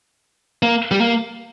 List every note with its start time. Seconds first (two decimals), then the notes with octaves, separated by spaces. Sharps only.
0.62 A#3
0.91 G3
1.01 A#3